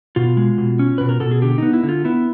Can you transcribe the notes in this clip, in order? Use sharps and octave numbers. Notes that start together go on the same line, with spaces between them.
B2 F4
G#3
B2
C#4
B2 B4
A#4
B2 A4
G#4
D3 G4
B3 D#4
E4
D3
F4
B3 E4